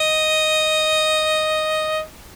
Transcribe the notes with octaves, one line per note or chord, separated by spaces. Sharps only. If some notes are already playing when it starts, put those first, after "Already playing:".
Already playing: D#5